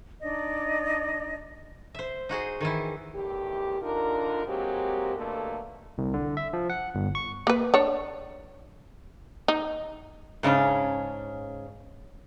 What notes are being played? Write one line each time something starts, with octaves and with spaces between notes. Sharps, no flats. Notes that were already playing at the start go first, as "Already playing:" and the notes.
D4 D#4 D5 D#5
C5 E5
D#4 F#4 G#4 C5
D#3 E3 E4
E2 A2 D#3 G4
D3 D4 D#4 F4 A#4
F#3 G#3 A#3 C4 G4
B2 D3 A3 A#3
C2
D3
E5
F3
F#5
G1
C#6
A#3 B4
D4 C#5
D#4
G#2 C#3 C#4 D4